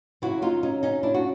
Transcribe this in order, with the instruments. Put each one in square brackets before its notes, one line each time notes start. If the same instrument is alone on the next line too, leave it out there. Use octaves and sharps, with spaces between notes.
[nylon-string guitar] F#2 C#3 F#3 E4 F#4
D#4 F4
C#4 D#4
C#4 D#4
D4 E4
F#4